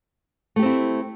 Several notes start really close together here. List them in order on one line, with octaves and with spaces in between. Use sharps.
A3 G4 C4 E4